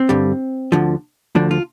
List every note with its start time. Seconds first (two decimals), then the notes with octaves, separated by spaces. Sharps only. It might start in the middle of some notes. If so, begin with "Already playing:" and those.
Already playing: C4
0.09 G2 D3 G3
0.72 D2 D3 F3
1.35 D2 D3 F3 D4
1.51 F4